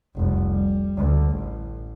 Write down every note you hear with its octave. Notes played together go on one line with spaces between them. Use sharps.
F1 C2
G3
D2
A1